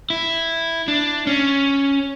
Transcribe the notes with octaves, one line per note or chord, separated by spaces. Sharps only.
E4
D4
C#4